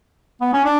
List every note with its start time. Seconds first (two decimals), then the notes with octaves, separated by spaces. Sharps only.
0.41 B3
0.53 C#4
0.64 D4